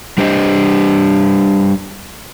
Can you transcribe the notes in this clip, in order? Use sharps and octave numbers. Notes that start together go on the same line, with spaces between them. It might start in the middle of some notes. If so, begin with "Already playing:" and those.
G3 D4 G4 C5 D#5